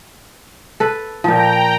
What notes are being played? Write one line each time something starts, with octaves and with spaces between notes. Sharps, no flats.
A4 B4
A#2 F3 G5 A#5